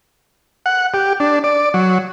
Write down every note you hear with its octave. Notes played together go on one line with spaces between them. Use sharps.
F#5
G4
D4
D5
F#3